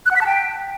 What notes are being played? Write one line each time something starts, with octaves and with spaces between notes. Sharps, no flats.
F#6
F#5
B6
A5
G5